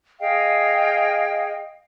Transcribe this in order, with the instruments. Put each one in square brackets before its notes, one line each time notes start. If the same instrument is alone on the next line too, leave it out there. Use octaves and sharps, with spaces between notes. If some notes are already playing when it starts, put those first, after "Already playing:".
[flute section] G#4 D#5 F5 G5